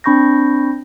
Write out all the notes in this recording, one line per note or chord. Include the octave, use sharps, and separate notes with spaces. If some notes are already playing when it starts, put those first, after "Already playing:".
C4 D4 B5 C#6 G6 A#6